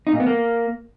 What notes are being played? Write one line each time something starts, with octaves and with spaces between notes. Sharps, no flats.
D#4
A#2
B3
A#3